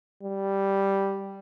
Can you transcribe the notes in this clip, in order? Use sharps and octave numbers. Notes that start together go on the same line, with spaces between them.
G3